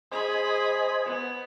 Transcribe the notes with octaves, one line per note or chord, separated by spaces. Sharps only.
G#4 C5 D#5 G#5 B5
B3